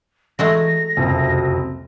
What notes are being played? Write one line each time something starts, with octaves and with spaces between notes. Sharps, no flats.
E3 F#3 G#3 A3 A#6
F#1 C2 F2 F#4